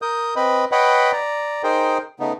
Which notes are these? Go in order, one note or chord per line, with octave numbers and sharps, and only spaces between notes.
A#4 D#6 G6
C4 B4 D#5 B5
B4 C#5 D#5 F#5 G5 B5
D5 A#5
D#4 G#4 A#4 C5 G5
C#3 A3 B3 D#4